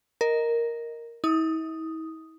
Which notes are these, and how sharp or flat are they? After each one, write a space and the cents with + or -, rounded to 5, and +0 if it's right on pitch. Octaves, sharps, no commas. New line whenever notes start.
A#4 +0 D#5 +0
E4 -45 D#6 +0